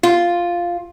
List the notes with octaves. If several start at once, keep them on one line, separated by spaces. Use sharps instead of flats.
F4